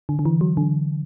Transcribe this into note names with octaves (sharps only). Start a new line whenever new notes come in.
D3
D3
E3
F#3
D3